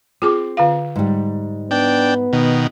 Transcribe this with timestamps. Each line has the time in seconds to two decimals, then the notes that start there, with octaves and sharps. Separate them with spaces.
0.22 C4 F4 G#4 D6
0.57 D3 F4 F5
0.96 G#2 G3
1.71 B3 D4 G5
2.33 B2 D#3